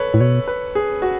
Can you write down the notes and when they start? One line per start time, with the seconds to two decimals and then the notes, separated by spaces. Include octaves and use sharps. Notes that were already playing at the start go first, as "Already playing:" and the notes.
Already playing: A4 B4 C#5
0.14 A2
0.20 B2 C#5
0.48 B4
0.75 G#4
1.02 F#4